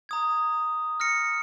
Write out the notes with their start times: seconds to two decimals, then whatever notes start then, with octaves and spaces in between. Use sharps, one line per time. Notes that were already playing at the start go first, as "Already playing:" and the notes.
0.09 A#5 D#6 G#6
1.00 F6 A#6 C#7